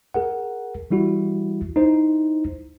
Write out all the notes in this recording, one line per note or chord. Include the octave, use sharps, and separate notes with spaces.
G#4 A#4 F#5
E3 G3 E4 F#4
D#4 E4 C5